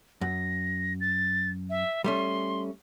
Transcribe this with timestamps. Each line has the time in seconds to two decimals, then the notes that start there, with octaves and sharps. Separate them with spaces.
0.21 F#2 A#6
1.01 A6
1.70 E5
2.04 G3 A3 C#4 C6